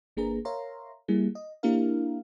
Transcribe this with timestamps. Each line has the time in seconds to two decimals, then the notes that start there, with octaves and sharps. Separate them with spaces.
0.17 G1 A#3 D4 G#4 B4 A#5
0.45 A#4 C#5 E5 F5 A#5 C6
1.08 G3 A#3 E4 G#4
1.35 D#5
1.63 A#3 D4 E4 G4 A#4 F5